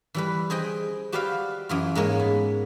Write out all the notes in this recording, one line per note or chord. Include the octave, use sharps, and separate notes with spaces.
E3 G3 B4
G#4 C5 D#5 G5
F#4 G4 B4 D5 E5 F5
F#2 E3 F4
G#2 G#3 A#3 C#5
B3